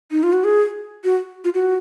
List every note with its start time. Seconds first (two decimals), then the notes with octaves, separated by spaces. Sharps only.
0.11 D#4
0.23 F4
0.33 F#4
0.44 G#4
1.04 F#4
1.44 F4
1.54 F#4